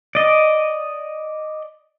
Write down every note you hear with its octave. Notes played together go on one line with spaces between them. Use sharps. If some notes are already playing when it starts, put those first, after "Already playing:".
D5 D#5